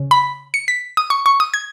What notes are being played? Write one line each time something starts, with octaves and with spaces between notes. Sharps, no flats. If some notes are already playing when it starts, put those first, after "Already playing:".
Already playing: C#3
B5
C#7
B6
D#6
C#6
C#6
D#6
G#6